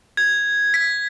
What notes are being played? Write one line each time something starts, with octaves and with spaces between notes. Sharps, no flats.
G#6
B6